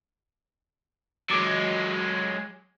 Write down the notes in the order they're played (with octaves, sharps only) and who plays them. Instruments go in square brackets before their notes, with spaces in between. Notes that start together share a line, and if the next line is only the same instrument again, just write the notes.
[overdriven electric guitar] F#3 G#3 [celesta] D6 A6 D7